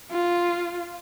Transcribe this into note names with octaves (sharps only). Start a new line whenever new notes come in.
F4